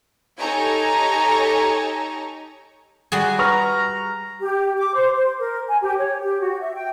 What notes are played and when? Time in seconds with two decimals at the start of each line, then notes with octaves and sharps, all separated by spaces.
0.39 D#4 G4 A4 C#5 G#5 A#5
3.12 G3 F#4 G#4
3.39 B4 A#5 C#6 F6
4.41 G4
4.77 D6
4.94 C5
5.15 C5
5.39 A#4
5.68 G#5
5.81 G4
5.98 C#5
6.21 G4
6.41 F#4
6.61 E5
6.74 G5